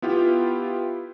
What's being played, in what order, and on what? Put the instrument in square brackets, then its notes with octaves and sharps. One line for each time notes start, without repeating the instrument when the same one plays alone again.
[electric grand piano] B3 E4 F4 G4